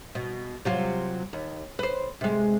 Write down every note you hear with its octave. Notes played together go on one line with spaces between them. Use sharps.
B2
C3 F#3 F4
D#2
B4 C5
C3 G#3